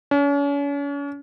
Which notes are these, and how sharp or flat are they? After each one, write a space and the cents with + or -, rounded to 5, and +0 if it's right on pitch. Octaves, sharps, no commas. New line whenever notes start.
C#4 +40